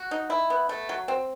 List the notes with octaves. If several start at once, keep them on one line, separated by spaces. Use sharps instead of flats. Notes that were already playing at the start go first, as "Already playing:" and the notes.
Already playing: F#4
D#4
E4
B3
A3
F#3
C4